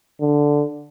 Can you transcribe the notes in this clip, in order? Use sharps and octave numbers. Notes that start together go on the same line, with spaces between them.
D3